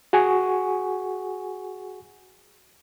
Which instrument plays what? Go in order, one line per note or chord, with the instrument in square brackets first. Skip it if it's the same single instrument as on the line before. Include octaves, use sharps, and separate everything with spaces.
[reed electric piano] F#4 G#4 F#5 G#5 C#6